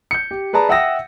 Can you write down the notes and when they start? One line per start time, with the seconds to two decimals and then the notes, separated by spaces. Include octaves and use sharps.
0.11 G6 C#7
0.31 G4
0.53 G#4 B4 D5 A5 A#5
0.69 E5 F#5 G5 D#6 E6 A#6